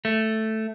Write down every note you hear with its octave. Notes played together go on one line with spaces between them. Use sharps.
A3